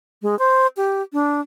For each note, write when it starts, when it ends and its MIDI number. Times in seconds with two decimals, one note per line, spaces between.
0.22 0.37 56
0.39 0.67 72
0.77 1.02 67
1.13 1.41 62